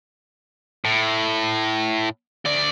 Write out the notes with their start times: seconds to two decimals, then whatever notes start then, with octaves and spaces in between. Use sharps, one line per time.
0.85 A2
2.45 D2 D5